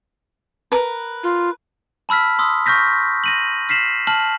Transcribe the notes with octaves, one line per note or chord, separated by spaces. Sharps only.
A#4 B4
F4
A5 B5 E6 F6 B6
C6 D#6 E6
C#6 F6 G6 A#6 B6
A#6 D#7 F#7
F6 B6 C7 E7 F#7
A5 F6 F#7